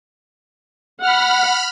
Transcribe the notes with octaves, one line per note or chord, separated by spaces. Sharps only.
F#5 B5 F6